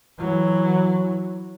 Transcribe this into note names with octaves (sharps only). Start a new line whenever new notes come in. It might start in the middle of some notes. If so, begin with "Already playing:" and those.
E3 F#3